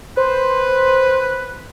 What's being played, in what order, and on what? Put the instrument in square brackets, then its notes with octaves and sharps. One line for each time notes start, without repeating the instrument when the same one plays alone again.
[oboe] B4 [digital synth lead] C5